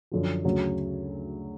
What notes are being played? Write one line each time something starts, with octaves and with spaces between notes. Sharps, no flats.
F#2 D3 F3
D2 C#3 F#3